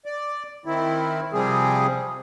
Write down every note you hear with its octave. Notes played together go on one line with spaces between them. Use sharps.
D5
D#3 C4 E4
C3 F3 G3 C4 G#4